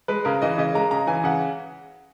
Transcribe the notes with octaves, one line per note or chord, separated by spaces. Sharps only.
G#3 B4
C#3 A#4
E3 D#5
C#3 D#5
G#3 A#5
C#3 A#5
E3 G#5
C#3 F#5